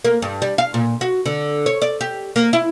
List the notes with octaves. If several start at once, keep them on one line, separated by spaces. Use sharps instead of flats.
A#3
G2
G3
F5
A#2
F#4
D3
C#5
D5
G4
A#3
E4